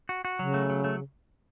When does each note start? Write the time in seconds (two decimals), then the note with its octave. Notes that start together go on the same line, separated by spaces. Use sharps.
0.09 F#4
0.25 F#4
0.39 C#3 F#3
0.54 A3
0.70 F#3
0.84 A3